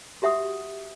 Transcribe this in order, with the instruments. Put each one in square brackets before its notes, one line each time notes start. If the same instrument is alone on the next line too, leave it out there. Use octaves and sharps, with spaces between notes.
[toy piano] F#4 G4 E5 F#5 D#6